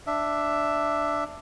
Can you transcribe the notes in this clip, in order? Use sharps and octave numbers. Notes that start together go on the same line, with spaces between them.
D4 E5